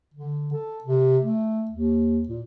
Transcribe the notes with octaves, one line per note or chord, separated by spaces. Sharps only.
D3
A4
C3
A3
D#2
A#2